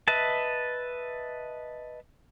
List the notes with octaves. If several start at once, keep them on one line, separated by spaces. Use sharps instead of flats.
B4 D#5 E5 A5